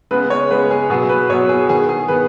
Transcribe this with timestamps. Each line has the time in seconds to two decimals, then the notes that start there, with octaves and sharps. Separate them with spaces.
0.11 C#3 G#3 B3 B4
0.30 C#5
0.51 C#3 G#3 B3 B4
0.71 G#4
0.90 B2 F#3 B3 G#4
1.09 B4
1.30 B2 F#3 B3 C#5
1.49 G#4
1.69 D#3 G#4
1.72 B3
1.89 G#4
2.08 D#3 B3 B4